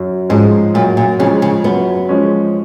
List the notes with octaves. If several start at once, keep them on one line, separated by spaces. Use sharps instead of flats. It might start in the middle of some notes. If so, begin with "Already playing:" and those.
Already playing: F#2
G#2 F3 G#3 C#4
F#2 A#2
A#2
C#3 F3 G#3 C#4
C#3
F#2 B3
F3 G#3 C#4